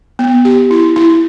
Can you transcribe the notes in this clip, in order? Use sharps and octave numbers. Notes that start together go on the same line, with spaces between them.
B3
G4
E4
E4